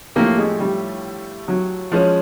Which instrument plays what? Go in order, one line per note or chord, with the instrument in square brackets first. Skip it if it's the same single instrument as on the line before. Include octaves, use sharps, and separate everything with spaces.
[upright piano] A2 F3 A3 D4 G4 [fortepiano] A#3
[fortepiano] G#3
G3
F#3
[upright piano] F3 G#3 C#4